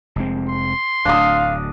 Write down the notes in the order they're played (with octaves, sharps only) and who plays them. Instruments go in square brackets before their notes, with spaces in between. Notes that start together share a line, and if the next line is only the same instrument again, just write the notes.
[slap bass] F1 G#3 C4
[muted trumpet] C6
[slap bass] D1 D2 [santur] D4 D#6 [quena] F5